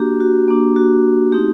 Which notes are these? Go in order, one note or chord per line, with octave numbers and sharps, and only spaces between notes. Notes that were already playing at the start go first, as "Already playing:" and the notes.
Already playing: A#3 D4 F#4 G4
F#4
A#3 D4 F#4
F#4
A3 C4 D#4 F#4 G4